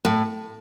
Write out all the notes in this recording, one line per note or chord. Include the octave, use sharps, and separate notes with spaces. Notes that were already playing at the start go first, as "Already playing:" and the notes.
A2